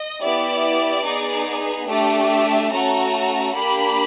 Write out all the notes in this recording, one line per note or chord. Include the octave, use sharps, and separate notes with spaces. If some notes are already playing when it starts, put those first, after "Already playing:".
Already playing: D#5
B3 E4 G4 D5
B3 D#4 G#4
A3 D4 G4
E5
A3 C#4 F#4 A4 A#5
A#3 D4 G4 B5